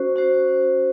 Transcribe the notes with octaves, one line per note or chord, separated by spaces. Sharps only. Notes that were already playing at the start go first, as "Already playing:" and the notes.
Already playing: C#4 F#4 C5
C#4 F#4 C5